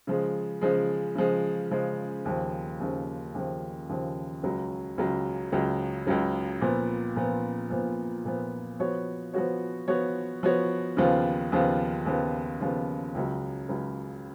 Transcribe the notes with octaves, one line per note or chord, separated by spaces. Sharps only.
C#3 F3 G#3
C#3 F3 G#3
C#3 F3 G#3
C#3 F3 G#3
D#2 C#3 F3
D#2 C#3 F3
D#2 C#3 F3
D#2 C#3 F3
C#2 C#3 F#3
C#2 C#3 F#3
C#2 C#3 F#3
C#2 C#3 F#3
A#2 F3 B3
A#2 F3 B3
A#2 F3 B3
A#2 F3 B3
F3 B3 F#4 C#5
F3 B3 F#4 C#5
F3 B3 F#4 C#5
F3 B3 F#4 C#5
D#2 C#3 F3 B3 F4
D#2 C#3 F3 B3 F4
D#2 C#3 F3 B3 F4
D#2 C#3 F3 B3 F4
C#2 C#3 F#3
C#2 C#3 F#3